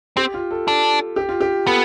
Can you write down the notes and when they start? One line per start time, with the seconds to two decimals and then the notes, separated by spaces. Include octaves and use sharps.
0.17 C4 G4
0.34 F4
0.51 A4
0.67 D4 A4
1.16 G4
1.29 F4
1.41 G4
1.67 B3 A4